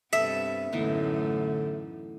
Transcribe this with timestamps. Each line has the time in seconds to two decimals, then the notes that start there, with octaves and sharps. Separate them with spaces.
0.13 G2 C3 B3 A4 E5
0.73 F#2 A2 D3 E3 A3 B3 D#4